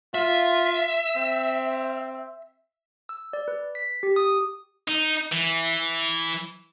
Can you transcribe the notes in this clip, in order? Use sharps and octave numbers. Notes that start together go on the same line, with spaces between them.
F4 E5
C4
E6
D5
B4
B6
G4
D#6
D#4
E3